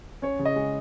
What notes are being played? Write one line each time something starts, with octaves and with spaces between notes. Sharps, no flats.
C#4 C#5
C#3
D#5
G#3